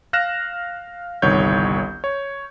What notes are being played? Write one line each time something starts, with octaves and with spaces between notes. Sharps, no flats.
F5 F6 F#6 A#6 E7
G1 C2 D#3 C#5 G6
C#5